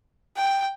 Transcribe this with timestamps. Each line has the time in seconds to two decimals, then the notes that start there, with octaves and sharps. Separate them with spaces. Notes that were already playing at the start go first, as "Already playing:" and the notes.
0.36 G5